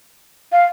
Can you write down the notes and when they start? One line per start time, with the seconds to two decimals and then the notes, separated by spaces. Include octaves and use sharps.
0.52 F5